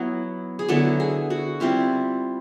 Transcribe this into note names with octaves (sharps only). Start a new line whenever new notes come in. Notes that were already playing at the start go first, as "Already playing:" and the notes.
Already playing: F#3 B3 E4
G#4
D3 F#3 B3 E4 A4
G#4
F#4
G3 C4 E4 F4